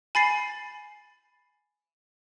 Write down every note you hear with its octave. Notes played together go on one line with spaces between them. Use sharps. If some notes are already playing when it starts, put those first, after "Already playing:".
G#5 B5 A6 C7